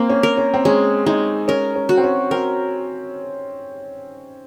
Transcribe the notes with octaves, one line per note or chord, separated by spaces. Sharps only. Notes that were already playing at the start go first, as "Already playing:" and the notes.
Already playing: A#3 C4
C#4
A#4
C#4
C4
G#3 C#4
G#3 D#4
C#4 A#4
C#4
F#4
C4
C#4
C4 A#4